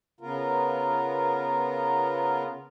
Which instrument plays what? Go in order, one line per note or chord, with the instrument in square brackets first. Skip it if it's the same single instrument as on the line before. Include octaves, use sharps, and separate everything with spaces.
[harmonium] C#3 B3 F4 A#4